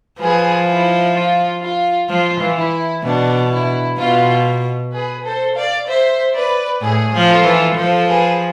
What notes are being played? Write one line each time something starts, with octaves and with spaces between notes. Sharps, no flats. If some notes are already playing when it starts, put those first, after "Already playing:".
F3 G#4 B4
E4
F4
F4
F3 F4
E3
E4
B2 D4
E4
B2 F4
G#4 B4
A4 C5
D5 F5
C5 E5
B4 D5
A2 G#4
F3
F4 A4
E3
F3 A4 C5
G#4 B4